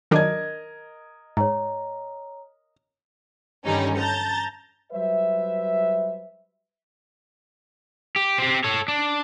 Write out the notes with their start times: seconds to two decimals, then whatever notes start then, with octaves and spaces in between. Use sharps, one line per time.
0.11 D#3 F#3 D4 A#4 D#5 G#6
1.37 G#2 C#5 A#5
3.65 G2 D3 D#3 G3 C#4 D#4
3.98 A5 A#5 G6 A6
4.92 F#3 G3 B4 C5 E5
8.16 G4
8.38 C4 G4
8.64 A4 C#5
8.88 D4